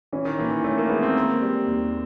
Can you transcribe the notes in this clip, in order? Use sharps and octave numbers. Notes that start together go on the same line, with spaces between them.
E3 C#4
D#3
A#2 E3
E3
A3 C#4
A#3
G#3 B3
C4
A#3
G3
D#2